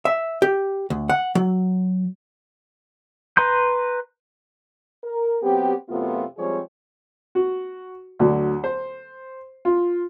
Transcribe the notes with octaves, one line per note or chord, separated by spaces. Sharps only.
E5
G4
D2
F#5
F#3
B4 A#5 C6 G6
A#4
F#3 B3 C4 G4
F#2 C3 A3 B3 F4
F3 G3 G#3 C4 G#4 C#5
F#4
D2 D3 F#3
C5
F4